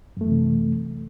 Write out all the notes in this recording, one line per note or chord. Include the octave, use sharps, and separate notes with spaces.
F#2 C3 E3 A3